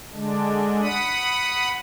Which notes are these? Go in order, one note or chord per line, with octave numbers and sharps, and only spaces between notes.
D3 G#3 D4
F#5 B5 D#6